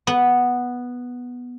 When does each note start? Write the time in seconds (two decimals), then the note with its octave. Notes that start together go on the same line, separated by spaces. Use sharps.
0.07 B3